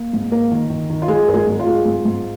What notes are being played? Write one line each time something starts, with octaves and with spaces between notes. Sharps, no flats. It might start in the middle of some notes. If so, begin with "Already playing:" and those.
Already playing: A#3
G#2
A#3 A#4
D#3
D#3
D#3
F4
G#3 G#4
G#1 A#4
G#3 G#4
G#2
F4
G#3
G#2
G#2